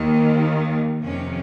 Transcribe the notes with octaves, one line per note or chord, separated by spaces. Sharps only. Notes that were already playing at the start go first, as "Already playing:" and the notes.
Already playing: D#2 D#3
F2 C3 D#3 C#4